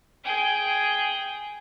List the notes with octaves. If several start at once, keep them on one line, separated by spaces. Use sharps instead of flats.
G#4 G5